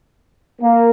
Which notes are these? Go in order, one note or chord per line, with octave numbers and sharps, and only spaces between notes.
A#3